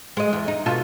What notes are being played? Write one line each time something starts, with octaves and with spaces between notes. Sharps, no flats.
G#3 D#5
E2
D#4
B2 F4 A4